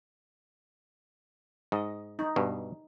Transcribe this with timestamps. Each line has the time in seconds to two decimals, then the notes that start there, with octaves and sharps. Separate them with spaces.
1.72 G#2 D#5
2.19 D#4
2.36 G2 B2